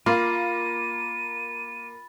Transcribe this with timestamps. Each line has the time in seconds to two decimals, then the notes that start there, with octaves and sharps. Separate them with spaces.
0.06 A#3 F4 B5 A6 D#7